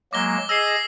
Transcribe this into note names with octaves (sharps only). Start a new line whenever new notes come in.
F#3 G#3 A#3 D6 A#6 G7
G#4 D#5 E6 A#6 C7